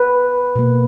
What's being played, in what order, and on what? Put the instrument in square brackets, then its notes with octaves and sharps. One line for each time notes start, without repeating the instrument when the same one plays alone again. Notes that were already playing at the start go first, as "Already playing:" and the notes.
Already playing: [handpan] B4
B2 A#3